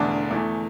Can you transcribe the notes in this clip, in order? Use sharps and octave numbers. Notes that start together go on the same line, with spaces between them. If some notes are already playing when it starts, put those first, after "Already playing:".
Already playing: E1 E2 D3 A3 D4
E2 E3 A3